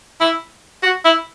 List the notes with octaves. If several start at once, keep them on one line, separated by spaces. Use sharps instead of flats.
E4
F#4
E4